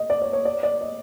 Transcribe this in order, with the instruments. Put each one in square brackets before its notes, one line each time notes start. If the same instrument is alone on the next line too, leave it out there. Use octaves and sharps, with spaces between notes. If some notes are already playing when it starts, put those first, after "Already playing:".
Already playing: [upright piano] D#5
D5
C#5
C#5
D5
D5
D#5